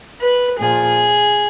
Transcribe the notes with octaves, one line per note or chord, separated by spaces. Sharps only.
B4
A#2 F3 G#4